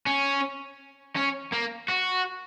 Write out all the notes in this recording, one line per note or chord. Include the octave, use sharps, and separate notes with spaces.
C#4
C#4
A#3
F#4